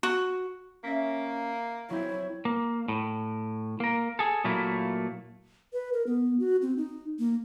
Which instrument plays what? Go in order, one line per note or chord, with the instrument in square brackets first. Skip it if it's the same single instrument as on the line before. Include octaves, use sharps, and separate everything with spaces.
[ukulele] F#4
[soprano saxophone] A#3 [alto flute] C#4 [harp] E5 A#6 B6
[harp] F#3 C4 [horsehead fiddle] E4 [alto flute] C#5
[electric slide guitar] A#3
A2
A#3 A#4
G#4 A4
A#2 F#3 A3 A#3 E4
[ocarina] B4
A#4
B3
F#4
C4
D#4
A#3